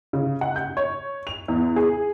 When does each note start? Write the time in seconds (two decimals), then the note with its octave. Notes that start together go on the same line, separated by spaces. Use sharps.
0.13 C#3
0.41 F#5
0.56 G6
0.77 C#5
1.27 F7
1.48 E2
1.76 G#4